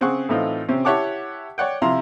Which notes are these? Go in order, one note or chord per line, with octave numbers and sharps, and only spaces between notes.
C#3 C4 G#4 F#5 C#6
A2 E3 A3 C4 D#4 F4
C3 C4 C#4
E4 G4 C#5 F#5 A5 D6
C#5 D5 F#5 G5
C3 F3 E4 F4 A#5 C6